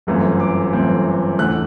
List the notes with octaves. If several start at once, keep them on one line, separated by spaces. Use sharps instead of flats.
G1 F#2 E3 A3 C4
D6
G1 F#2 E3 A3 C4
E2 D3 A3 F#6